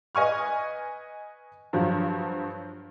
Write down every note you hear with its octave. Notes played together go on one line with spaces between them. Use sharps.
B4 D#5 G#5 C#6 F6
G2 F3 F#3